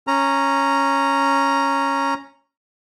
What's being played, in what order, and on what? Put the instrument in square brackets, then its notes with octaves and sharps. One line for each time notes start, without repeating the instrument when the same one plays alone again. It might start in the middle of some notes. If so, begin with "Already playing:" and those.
[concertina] C#4 A#5